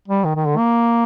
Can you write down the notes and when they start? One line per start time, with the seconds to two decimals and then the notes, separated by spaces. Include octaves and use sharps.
0.08 G3
0.25 D#3
0.36 D#3
0.47 D3
0.57 A#3